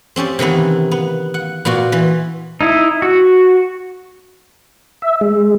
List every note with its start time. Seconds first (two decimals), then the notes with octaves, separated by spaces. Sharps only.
0.16 C4 C#4 G4 D5
0.39 C3 D#3 E3 B3
0.91 B3
1.34 F#5
1.65 A#2 B3 F4 F#4
1.92 E3
2.61 D#4 E4
3.02 F#4
5.02 E5
5.21 G#3